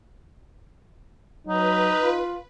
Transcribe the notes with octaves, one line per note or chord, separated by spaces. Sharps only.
F#3 D#4 B4
F4